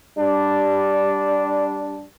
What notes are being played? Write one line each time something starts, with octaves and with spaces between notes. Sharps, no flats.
G3 D4